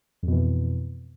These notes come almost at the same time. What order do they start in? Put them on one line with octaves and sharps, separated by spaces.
F2 B2 E3